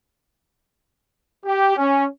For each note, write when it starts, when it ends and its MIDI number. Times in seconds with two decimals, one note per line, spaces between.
1.46 1.75 67
1.77 2.04 61